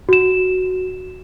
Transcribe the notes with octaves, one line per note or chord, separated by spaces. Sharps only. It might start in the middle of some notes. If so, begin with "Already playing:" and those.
F#4 E7